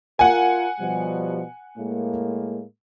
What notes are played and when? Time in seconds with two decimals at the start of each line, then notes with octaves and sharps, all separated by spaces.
0.19 F4 A#4 F#5 G#5
0.79 B2 F3 G3
1.77 A2 G#3 A#3